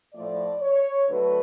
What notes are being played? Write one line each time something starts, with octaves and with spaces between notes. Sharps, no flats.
A2 F3 A3 D5
C#5
D3 F#3 A3 B4